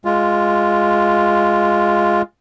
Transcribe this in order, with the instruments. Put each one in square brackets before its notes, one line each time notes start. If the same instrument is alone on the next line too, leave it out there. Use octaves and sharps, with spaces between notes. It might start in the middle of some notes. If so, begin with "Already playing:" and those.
[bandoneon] G#3 F4